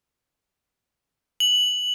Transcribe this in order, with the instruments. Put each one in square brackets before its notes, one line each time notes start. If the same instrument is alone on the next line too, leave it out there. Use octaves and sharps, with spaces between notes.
[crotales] F#7